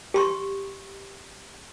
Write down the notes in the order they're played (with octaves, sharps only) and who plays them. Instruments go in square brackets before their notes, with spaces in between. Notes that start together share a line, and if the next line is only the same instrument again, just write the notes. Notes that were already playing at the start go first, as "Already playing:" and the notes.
[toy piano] G4 C6 C#6